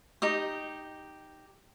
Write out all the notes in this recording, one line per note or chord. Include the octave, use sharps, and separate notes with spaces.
D#4 G4 D#6